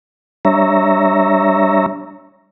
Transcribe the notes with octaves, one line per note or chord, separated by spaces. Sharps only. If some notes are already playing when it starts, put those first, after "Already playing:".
G3 D4 C#5 E5 A#5